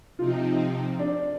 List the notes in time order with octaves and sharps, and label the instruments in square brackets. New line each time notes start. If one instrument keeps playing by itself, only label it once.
[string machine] C3 F3 C4 D#4 [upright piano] F4
[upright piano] D4